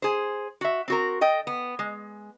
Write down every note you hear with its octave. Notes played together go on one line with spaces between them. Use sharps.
G#4 C5
F#4 E5
C4 F#4 A#4
A4 D#5 G5
B3
G#3